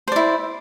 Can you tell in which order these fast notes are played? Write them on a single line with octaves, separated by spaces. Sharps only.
C5 D5 E4